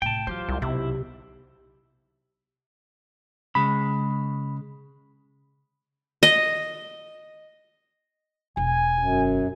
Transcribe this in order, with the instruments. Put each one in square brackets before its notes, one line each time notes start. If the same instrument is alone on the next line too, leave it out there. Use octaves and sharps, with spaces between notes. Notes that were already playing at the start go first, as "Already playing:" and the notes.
[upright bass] A2 C3 [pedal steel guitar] G5 A5
[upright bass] E3 F#3 [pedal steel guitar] F4 G4 C5
[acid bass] C2
[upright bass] B1 [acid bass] C3 [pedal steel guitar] E4
[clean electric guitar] C#3 G#3 [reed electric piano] B5
[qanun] D#5
[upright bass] E1 [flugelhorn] G#5
[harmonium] F#2